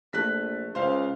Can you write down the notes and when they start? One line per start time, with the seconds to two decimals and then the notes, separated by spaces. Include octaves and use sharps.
0.13 A#1 A3 F#6 B6
0.75 C#2 C5 F5